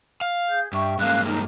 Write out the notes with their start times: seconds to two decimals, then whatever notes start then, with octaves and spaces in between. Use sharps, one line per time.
0.21 F5
0.49 G#4 G6
0.73 G2 E5 G5 C#6
0.99 G2 G#3 A#3 C#4 F5 F#6
1.24 D#4